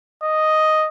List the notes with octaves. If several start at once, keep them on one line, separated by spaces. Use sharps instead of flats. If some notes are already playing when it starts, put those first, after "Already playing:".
D#5